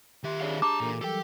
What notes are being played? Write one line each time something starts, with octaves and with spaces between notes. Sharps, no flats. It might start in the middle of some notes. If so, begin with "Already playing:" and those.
D#3 G4 E5 C6
D4 G#4 C#5 F5
D4 A5 A#5 D6
A#2 E3 A4 A#4
E3 F#3 G3 G4 A4 G5